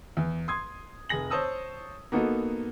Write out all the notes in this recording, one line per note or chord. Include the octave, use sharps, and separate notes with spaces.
E2
C6 D#6 G#6
F1 G#4 G#5 A#6 F#7
C5 C#5 A5 D#6 E6
A#3 B3 D#4 F#4 A4